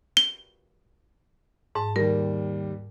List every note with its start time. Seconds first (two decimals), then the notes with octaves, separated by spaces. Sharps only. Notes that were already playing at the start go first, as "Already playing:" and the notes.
0.17 G7
1.75 G#2 A5
1.96 D#2 G3 A#4